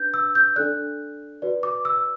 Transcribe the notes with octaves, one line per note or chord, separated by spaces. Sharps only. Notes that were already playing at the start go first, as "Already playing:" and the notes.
Already playing: D4 B4 G6
E6
G6
D4 A4 D5 F#6
F#4 B4 D5
D6
E6